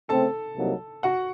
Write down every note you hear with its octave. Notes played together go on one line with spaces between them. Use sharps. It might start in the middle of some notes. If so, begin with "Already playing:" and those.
C#3 A3 C4 A4 A5
C2 C3 F#3 A#3 D#4
F#4 F#5